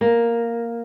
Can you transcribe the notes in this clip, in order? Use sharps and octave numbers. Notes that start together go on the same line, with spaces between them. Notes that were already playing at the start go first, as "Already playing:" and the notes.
A#3